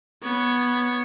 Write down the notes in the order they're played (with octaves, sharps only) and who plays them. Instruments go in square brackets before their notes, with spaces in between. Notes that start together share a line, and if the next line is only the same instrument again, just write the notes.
[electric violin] B3 C#5